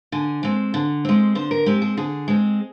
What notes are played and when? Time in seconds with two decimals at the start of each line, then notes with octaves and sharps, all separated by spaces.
0.12 D3 G#5
0.43 G#3 C4
0.74 D3
1.05 G#3 C4
1.35 D3 C5
1.51 A#4
1.66 G#3 C4 G4
1.82 G#4
1.97 D3 G#4
2.28 G#3 C4